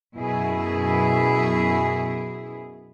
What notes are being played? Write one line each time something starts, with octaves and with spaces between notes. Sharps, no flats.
F#2 B2 E4 G#4